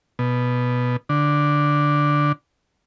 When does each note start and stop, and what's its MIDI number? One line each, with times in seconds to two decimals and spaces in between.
0.19 0.96 47
1.09 2.32 50